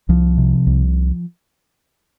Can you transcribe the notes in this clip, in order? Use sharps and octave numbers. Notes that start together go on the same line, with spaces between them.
C2 F3
C3
C2